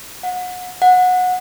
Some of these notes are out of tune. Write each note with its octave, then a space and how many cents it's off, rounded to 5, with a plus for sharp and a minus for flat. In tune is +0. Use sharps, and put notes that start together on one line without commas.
F#5 -30
F#5 -20